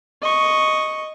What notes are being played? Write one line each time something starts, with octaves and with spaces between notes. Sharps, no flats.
D#5 C#6